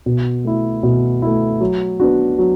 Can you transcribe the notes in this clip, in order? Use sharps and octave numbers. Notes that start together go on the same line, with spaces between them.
B2
A3 E4
B2
A3 E4
F#3
B3 D4 F#4
F#3